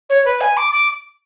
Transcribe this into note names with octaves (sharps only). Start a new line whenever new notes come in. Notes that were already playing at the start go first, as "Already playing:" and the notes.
C#5
B4
G#5
D6
D6